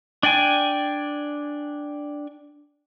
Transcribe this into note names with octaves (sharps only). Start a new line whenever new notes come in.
D4 D5 G5 G#5